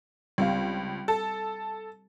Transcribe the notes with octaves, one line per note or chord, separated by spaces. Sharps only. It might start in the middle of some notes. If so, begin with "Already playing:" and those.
C#2 G3 C4 F5
A4